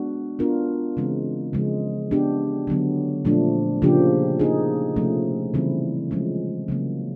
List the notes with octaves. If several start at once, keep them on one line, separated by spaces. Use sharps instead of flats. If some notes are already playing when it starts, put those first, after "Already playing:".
Already playing: G#3 B3 D4 F#4
B3 D4 F4 A#4
C#3 E3 G#3 C4
C#3 F3 G#3
B3 D4 G4
D3 F#3 B3
A#2 F3 A3 D4
C#3 F3 A#3 D4 G4
A#3 D#4 G#4
C3 F3 A3 C#4
C#3 E3 G3 C4 E4
F3 G#3 C#4
C#3 F#3 A#3